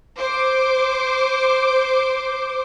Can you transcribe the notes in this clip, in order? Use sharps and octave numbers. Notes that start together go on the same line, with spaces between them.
C5 D6